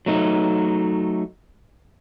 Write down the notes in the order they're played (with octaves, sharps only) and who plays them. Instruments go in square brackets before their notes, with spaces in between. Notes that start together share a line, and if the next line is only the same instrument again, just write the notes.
[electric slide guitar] F#3 A3 D#4